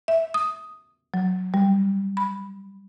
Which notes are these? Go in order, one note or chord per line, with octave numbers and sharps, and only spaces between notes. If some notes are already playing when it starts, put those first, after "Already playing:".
E5
D#6
F#3
G3
B5